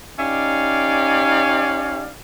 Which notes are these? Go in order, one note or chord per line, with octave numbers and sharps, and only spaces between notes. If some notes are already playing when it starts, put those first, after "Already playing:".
C#4 D#4 G4 D5 F5